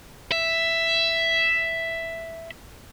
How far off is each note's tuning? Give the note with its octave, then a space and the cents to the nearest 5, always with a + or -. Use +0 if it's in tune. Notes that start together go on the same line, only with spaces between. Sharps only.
E5 +5